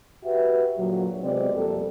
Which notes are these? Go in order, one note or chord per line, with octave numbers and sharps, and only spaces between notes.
F#4 G4 B4 E5
A#2 D3 F#3
C3 G#3 B3 C4 D5
F2 C3 G3 A#3 A4